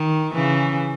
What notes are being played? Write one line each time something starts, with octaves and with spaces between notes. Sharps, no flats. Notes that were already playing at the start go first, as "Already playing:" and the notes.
Already playing: D#3
C#3 E3